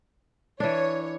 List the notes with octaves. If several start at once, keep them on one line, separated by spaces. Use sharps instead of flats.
E3 D4 C#5